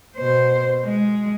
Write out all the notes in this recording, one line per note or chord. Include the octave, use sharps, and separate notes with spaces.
B2 C5
G#3